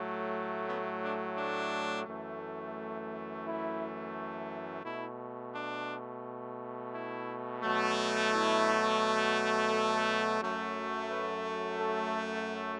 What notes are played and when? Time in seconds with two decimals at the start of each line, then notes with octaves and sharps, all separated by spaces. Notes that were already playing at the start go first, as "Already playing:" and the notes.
Already playing: A2 F#3 A3
0.69 B3
1.03 D4
1.38 D4
2.07 F#2 E3 A3
3.46 E4
4.85 B2 A3 E4
5.54 D4
6.93 E4
7.63 B2 F#3 A3
8.32 E4
9.71 A4
10.40 F#2 F#3 A3
11.10 B4
11.79 A4